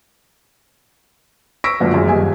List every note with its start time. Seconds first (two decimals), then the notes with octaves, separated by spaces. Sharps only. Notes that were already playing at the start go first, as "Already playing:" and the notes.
1.64 C#6 E6 A#6 B6 D7
1.80 C#2 F#2 A#2 D3 F3 F#3
1.94 G#1 F#2 G#3
2.07 D#1 G2 D#5 G#5